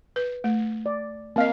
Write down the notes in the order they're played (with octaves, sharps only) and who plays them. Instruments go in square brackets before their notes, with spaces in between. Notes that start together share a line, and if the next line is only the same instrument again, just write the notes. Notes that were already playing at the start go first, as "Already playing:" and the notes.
[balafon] B4
A3
[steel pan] D5
[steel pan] A#3 F5 [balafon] C4 D#5